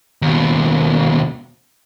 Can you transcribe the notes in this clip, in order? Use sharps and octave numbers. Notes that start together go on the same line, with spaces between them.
D#2 B2